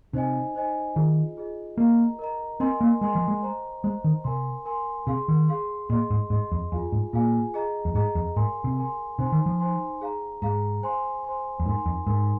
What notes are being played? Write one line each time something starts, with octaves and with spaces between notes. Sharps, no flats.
C3 D#4 C5 D#5 G#5
D#4 C5 D#5 G#5
D#3 F4 G#4 D#5
F4 G#4 D#5
A#3 A#4 D#5 A#5
A#4 D#5 A#5
C4 A#4 D#5 G#5 C6
A#3
G#3 A#4 D#5 G#5 C6
F3
G#3
C5 D#5 A#5
G#3 C5 D#5 A#5
D#3
C3 A#4 G#5 C6
A#4 G#5 C6
C3 G#4 F5 C6
D#3
G#4 F5 C6
A#2 G#4 D#5 C6
G#2
G#2 G#4 D#5 C6
F2
F2 F4 G#4 F5 G#5
G#2
A#2 F4 G#4 F5 G#5
G#4 D#5 A#5
F2
G#2 G#4 D#5 A#5
F2
G#2 A#4 G#5 C6
C3
A#4 G#5 C6
C3 D#4 C5 G#5 C6
D#3
F3
D#4 C5 G#5 C6
G#4 F5 A#5
G#2 G#4 F5 A#5
C5 G#5 C6
C5 G#5 C6
F2
G#2 D#4 A#4 G#5 C6
F2
G#2 D#4 A#4 G#5 C6